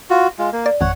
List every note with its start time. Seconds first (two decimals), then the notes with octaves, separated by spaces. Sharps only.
0.10 F4 F#4
0.39 G#3 F4
0.53 A#3
0.66 D5
0.81 G#1 F2 C#5 F#5